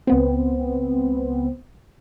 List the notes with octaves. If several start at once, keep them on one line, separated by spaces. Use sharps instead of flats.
C#2 B3 C4